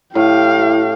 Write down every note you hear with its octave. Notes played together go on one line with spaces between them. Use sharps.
A2 E4 G4 F5